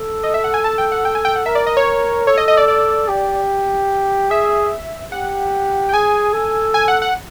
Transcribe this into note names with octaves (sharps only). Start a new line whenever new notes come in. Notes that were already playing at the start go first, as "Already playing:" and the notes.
Already playing: A4
D#5
E5
F#5
G#5
A5
G5
F#5
G5
G#5
G5
F#5
A#4 E5
D5
D#5
C#5
A4 C#5
D#5
D#5
D5
D5
G4
G#4 E5
G4 F#5
G5
G#4 G#5
A4
G#5
F#5
F#5